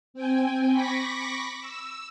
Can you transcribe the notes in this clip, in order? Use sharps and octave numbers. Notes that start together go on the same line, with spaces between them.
C4 G5 G#5
B5 C#6 D6 A#6 B6
E6